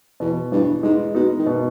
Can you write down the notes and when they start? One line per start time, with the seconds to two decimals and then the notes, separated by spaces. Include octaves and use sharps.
0.20 E2 B2
0.52 E2 G2
0.83 G#2 G#3
1.15 B2 D#4
1.38 D#3
1.47 B2